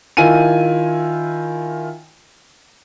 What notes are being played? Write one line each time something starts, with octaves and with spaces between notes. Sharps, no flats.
D#3 E4 F4 G#5 D#7